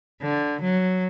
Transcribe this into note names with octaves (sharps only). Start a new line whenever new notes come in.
D3
F#3